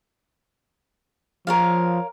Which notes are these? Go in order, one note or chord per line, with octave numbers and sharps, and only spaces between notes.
F3 A#4 C#5 F5